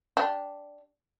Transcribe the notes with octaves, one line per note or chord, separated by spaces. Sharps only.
D4 G4